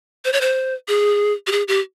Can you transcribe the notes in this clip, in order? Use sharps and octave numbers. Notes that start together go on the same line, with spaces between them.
C5
C#5
C5
G#4
G4
G#4
G4